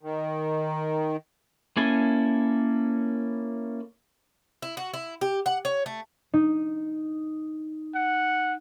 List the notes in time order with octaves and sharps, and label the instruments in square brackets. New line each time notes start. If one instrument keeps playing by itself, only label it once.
[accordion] D#3
[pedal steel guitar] A#3 C#4 E4 A4 G#5
[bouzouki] E4
F#4
E4
G4
F#5
C#5
A3
[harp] D#4
[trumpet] F#5